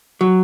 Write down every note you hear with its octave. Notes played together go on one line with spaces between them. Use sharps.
F#3